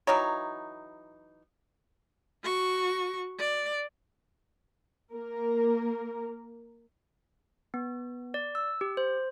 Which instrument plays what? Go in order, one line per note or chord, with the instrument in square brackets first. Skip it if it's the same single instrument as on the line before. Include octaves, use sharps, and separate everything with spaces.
[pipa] E3 F#3 D#4 C#5
[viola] F#4 C#6
D5
[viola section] A#3 A#4
[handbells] B3
D5
E6
G4
C5